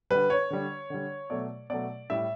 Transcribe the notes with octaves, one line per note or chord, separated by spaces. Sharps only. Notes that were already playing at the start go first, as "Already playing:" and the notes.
D3 G3 B4
C#5
D3 G3
D3 G3
B2 F#3 A3 D5
B2 F#3 A3 D5
A2 G3 E5